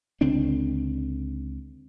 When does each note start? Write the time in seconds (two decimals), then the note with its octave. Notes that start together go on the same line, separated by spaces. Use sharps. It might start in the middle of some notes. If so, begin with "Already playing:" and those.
0.21 C#2 D3 C4 D4